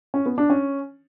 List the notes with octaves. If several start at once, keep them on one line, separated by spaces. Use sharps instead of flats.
C#4
B3
D4
C#4